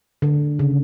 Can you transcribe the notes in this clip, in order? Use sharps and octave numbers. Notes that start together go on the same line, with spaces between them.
D3
C#3